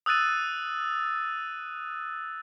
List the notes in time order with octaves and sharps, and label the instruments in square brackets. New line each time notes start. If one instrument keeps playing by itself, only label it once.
[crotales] D#6 E6 F#6 A6 D#7